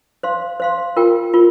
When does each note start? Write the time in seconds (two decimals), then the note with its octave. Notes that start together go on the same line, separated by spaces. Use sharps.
0.23 C5 F5 C6
0.60 C5 F5 C6
0.96 F4 A#4 G5
1.33 F4 A#4